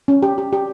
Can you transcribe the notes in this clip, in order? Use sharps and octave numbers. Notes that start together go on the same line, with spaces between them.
C#4
G4
G4
G4